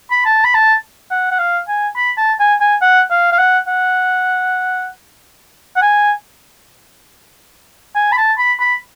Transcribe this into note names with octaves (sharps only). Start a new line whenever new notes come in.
B5
A5
B5
A5
F#5
F#5
F5
G#5
B5
A5
G#5
G#5
F#5
F5
F5
F#5
F#5
F#5
G#5
G#5
B5
A5
B5
B5